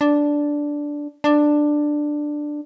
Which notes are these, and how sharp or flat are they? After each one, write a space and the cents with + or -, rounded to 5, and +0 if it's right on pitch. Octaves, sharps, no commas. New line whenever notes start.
D4 -5
D4 +10